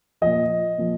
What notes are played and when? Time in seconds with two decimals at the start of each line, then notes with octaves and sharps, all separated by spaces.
0.21 A#2 F3 D#5
0.78 A#2 F3